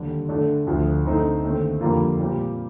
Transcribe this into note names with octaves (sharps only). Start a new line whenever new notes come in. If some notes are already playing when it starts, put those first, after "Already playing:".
Already playing: D#2 D3 G3
D3 A3 D4 A4
D2 D3 F3
D3 A3 C4 D#4
D#2 D3 A3 C4
F2 D3 G3 A#3 F4
A#2 G3 C4 G4